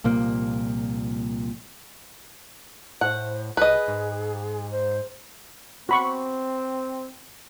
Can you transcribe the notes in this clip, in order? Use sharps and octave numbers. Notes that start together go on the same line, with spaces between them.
C2 A#2 F3 A#3
A2 C5 F#5
C2 G#4 B4 D#5
G#2
C5
C4 F#4 B5 C#6